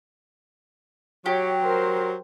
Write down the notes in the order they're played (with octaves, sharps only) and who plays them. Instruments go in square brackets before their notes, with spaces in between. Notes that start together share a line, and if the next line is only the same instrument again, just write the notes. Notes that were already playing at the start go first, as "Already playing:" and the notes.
[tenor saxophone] F#3 [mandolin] G4 [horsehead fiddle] C#5
[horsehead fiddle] A#4 C5